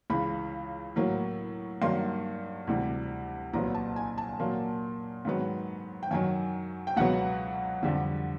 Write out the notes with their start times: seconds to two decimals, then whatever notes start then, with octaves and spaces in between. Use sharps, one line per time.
0.10 C#2 C#3 E3 B5
0.96 A2 F#3 A#3
1.82 G2 D#3 F#3 A#3 C6
2.67 D2 C3 E3 G3
3.53 C2 A#2 F#3 B3 A#5
3.74 A5
3.96 G#5
4.18 A5
4.39 A#2 F#3 A#3
5.25 G#2 D#3 F#3 B3
6.03 G5
6.11 F#2 D#3 F#3 G#5
6.87 G5
6.97 C#2 B2 F#3 B3 F#5
7.83 F2 D3 G3